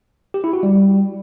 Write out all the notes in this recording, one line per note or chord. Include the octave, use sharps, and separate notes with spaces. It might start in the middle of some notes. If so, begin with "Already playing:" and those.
G4
E4
F#4
G3